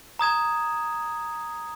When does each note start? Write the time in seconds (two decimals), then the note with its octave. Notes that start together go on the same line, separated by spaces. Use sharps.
0.19 A#5 D#6 G#6 E7